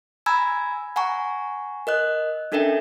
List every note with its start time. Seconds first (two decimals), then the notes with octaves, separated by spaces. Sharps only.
0.26 G#5 A#5 B5 E6 G#6
0.96 F#5 G#5 A#5 C#6
1.87 A#4 D#5 F#6
2.52 C#4 D4 A4 A#4 E5 G5